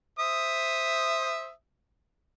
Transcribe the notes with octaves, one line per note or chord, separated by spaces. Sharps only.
C5 E5 D#6